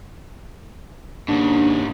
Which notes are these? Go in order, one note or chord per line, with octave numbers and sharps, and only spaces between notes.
D#2 G#2 C#3 D4